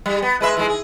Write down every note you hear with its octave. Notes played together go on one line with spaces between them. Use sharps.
G3
B3
G#3 B4 E5
E3 G#3
G#4